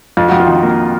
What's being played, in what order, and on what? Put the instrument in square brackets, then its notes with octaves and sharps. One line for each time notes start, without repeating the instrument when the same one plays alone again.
[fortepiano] F2 [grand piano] F4
[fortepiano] F2 [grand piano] F#4
[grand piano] F4
[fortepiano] D#3
A#3